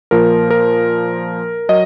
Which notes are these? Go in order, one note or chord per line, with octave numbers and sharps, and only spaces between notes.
A#2 F3 A#4
A#4
F#3 D#5